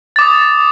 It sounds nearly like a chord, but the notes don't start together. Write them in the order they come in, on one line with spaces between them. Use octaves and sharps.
A6 D6 D#6